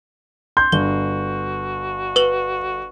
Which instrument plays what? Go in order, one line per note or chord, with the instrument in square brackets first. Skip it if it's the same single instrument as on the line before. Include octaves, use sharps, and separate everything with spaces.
[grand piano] C6 G6
[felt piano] G1 [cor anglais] F#4 [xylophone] G7
[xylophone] B4 F#7